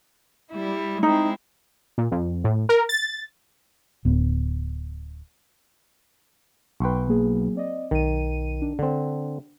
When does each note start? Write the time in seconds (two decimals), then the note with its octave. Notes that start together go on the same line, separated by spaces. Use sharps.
0.51 G3 E4
1.03 G#3 C4 D#4 E4
1.98 A#2
2.11 F2
2.44 A2
2.69 A#4
2.89 A6
4.05 D1 B3
6.80 B1 B4 G5 C6 C#6
7.08 F#3 A#3 G#4
7.55 C4 D5 D#5
7.91 B1 D#3 D#7
8.62 D4
8.79 D3 C4